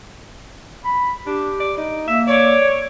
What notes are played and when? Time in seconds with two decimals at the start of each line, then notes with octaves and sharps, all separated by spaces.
0.84 B5
1.27 D4 G4
1.60 D5
1.77 D#4
2.08 A#3 E5
2.27 C#5 D5